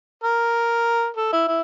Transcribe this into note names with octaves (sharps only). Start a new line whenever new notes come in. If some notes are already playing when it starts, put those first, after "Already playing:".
A#4
A4
E4
E4